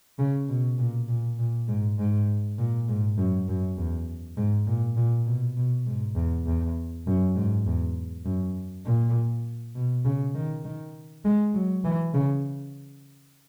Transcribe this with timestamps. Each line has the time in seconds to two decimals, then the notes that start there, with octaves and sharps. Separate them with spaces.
0.19 C#3
0.48 B2
0.78 A#2
1.08 A#2
1.39 A#2
1.68 G#2
1.98 G#2
2.58 A#2
2.88 G#2
3.17 F#2
3.48 F#2
3.78 E2
4.37 G#2
4.67 A#2
4.96 A#2
5.27 B2
5.57 B2
5.86 G#2
6.16 E2
6.46 E2
7.07 F#2
7.36 G#2
7.66 E2
8.25 F#2
8.85 A#2
9.75 B2
10.05 C#3
10.35 D#3
10.65 D#3
11.25 G#3
11.54 F#3
11.84 E3
12.14 C#3